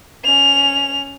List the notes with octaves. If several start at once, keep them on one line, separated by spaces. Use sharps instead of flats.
C#4 F7